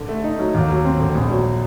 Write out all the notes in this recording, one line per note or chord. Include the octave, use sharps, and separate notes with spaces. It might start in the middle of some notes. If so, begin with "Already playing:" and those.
Already playing: D3
A3
D#4
F#3
D#2
F#3
C4
D3
A#1
F#3